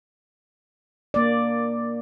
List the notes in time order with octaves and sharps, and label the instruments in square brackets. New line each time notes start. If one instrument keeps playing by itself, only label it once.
[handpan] A#3 D5